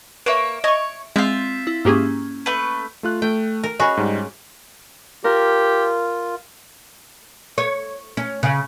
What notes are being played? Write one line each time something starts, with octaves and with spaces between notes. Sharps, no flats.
A#3 B4 C#5 E5 D7
C#5 D#5 C#6
G#3 C4 F4 E5
E4
G#2 A#3 C#4 G4 G#4
A3 B4
A3 F4 F#6
A3 G5
A#4
C#4 F#4 G#4 D#5 G#5 B5
G#2 G3
F4 G4 A#4
C#5
C#4
C#3